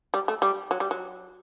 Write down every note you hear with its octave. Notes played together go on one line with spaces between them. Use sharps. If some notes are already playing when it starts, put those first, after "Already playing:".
G3
A3
G3
F#3
G3
F#3